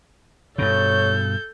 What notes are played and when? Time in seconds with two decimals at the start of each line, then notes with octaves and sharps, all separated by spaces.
0.58 G2 B2 A4 C#5 G6